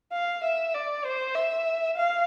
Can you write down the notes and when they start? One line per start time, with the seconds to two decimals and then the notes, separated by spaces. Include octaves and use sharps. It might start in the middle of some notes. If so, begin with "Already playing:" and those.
0.12 F5
0.43 E5
0.74 D5
1.05 C5
1.35 E5
1.96 F5